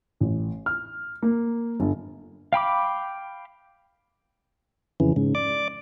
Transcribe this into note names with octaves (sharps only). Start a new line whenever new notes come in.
A1
F6
A#3
G1
F5 G5 B5 D6
F2 C#3 E3
G#2 C#3
D5 D6